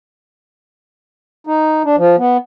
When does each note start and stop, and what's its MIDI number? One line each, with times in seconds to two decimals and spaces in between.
1.47 1.83 63
1.85 1.96 62
1.98 2.16 53
2.18 2.37 59